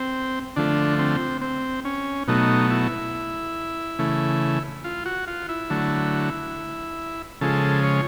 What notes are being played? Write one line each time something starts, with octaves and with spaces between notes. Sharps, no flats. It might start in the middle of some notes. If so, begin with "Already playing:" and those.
Already playing: C4
D3 F3 A3 D4
C4
C4
C#4
B2 F#3 A3 D#4
E4
C#3 E3 A3
F4
F#4
F4
E4
D3 F#3 A3
C#3 F3 G#3 A4
C#5